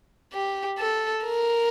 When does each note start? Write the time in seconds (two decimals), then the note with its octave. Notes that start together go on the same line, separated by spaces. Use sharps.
0.33 G4
0.79 A4
1.24 A#4